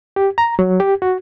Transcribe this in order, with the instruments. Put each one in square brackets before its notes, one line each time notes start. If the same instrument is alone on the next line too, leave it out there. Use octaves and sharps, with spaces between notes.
[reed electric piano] G4
A#5
F#3
G4
F#4